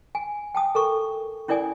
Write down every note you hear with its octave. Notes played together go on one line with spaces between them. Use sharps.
G#5
G5 A5 D#6
A4 A#4 C#6
C#4 E4 A#4 D5 G#5 D#6